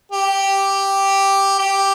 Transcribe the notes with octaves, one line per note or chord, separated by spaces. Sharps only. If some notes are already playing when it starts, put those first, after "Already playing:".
G4
G4